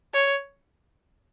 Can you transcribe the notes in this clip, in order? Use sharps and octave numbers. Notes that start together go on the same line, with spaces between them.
C#5